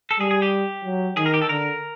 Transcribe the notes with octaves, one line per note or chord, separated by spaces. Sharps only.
A4
G3 G#4
G#4
G4
F#3
D#3 G#4
A#4
G4
A4
D3 A#4